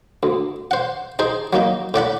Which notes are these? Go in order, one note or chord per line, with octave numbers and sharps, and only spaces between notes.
D2
C5 F#5
D#4 G#4 C5
F#3 A#3 D#4
A2 D5 F#5 B5